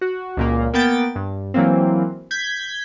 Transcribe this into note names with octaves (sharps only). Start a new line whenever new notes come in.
F#4
C#2 A#2 A#3
A#3 B3 G5 A6
G2
E3 F#3 A#3 C4
G6 G#6 B6